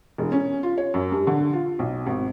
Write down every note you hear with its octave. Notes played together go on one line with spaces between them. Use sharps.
E1
C#4
F4
C#5
F#2
G2
D3
F4
B1
G#1